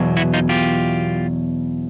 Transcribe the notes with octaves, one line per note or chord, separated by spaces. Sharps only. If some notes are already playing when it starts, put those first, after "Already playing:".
Already playing: E2 B2 F#3
E4 F#4
D#4 F4
F4 G4